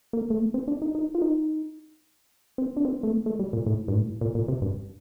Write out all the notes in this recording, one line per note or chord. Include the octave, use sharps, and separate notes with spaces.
A#3
A3
A#3
C4
D4
D#4
D#4
F4
D#4
C4
D4
C4
A3
A#3
A3
G3
A#2
A2
G2
A2
A#2
A#2
C3
G2